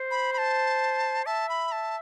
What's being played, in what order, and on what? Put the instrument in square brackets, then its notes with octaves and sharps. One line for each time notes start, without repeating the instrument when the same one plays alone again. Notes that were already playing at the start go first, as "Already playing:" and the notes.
Already playing: [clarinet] C5
[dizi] B5
B5
A5
[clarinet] E5 [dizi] A5
[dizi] B5
A5